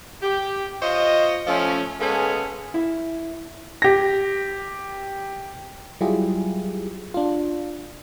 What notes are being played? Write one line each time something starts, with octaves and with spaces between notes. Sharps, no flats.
G4
F4 C5 C#5 D#5
F3 A3 C#4
G#3 A#3 B3 C#4 G#4 A4
E4
G4 A#6
F#3 G3 E4 F4 G4 G#4
D4 F4